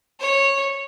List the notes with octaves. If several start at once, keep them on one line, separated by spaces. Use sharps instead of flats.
C#5